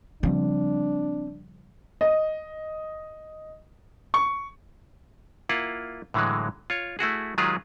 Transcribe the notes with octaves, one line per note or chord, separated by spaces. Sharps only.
C#3 F3 G3 C4 D4
D#5
C#6
A#3 E4 F4 F#5
A2 D3 E3 F#3 G#3
F4 C#5
A3 E4 F#4 G#4
D#3 F#3 G#3 F4 G4 G#4